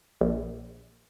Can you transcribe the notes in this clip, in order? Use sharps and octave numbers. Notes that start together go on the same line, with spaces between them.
A#1